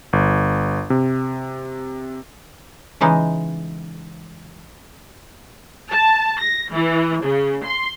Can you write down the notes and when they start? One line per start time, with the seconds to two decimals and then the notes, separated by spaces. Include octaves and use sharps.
0.13 G1
0.90 C3
3.01 C#3 E3 G#3 D#4
5.91 A5
6.40 A#6
6.72 E3
7.23 C#3
7.64 C6